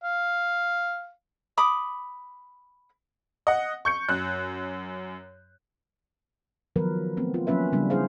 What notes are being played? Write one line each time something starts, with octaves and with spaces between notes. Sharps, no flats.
F5
B5 D6 D#6
D#5 F#5
C#6 G6 C#7
F#2 F#6
D#3 F3 F#3 B3 A#4 B4
A3 B3 C4
F4
F3 F#3 A#3 C#4 B4 E5
C#3 G3 B3 D4 D#4
G3 C#4 E4 G#4 C5 F5